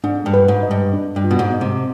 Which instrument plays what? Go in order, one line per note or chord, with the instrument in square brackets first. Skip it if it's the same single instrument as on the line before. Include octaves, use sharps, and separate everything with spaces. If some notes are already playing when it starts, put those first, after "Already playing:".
[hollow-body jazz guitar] G#2 [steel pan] D4
[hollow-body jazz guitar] G2
[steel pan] B4
[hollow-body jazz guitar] G#2
[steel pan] D#5
[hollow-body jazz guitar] G2
[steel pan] D4
[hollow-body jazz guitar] G2
[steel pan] F4
[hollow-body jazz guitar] B2
G#2
[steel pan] D#5
[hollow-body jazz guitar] C3